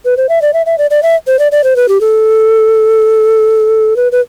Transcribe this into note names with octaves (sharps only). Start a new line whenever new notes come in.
B4
C5
E5
D5
E5
E5
D5
D5
E5
C5
D5
D5
C5
B4
G4
A4
B4
B4